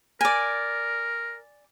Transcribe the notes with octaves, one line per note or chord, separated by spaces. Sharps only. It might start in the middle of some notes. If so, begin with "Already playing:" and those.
A#4 D5 G#5